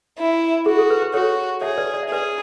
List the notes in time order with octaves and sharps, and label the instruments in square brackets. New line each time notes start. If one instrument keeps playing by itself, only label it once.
[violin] E4
[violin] F#4 [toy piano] G#4
[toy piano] A4
B4
B4
[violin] F#4 [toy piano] A4 C#5
[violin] G#4 [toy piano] C#5 E5
[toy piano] B4 D5
D5
E5
[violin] G#4 [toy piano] B4 D5